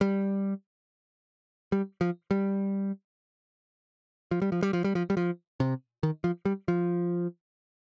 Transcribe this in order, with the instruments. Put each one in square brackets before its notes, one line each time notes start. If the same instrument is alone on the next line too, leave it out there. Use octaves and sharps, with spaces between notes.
[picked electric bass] G3
G3
F3
G3
F3
G3
F3
G3
F3
G3
F3
G3
F3
C3
D#3
F3
G3
F3